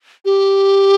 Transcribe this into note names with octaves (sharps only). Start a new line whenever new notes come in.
G4